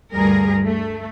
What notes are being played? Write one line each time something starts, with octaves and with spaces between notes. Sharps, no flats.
D2 G2 G3 G#4 A#4
A3